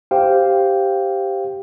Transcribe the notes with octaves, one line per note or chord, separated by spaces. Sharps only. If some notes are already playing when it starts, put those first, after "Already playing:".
G4 C5 F5 G5